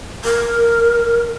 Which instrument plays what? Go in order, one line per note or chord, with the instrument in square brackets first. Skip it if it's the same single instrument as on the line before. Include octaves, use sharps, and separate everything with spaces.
[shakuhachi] A#4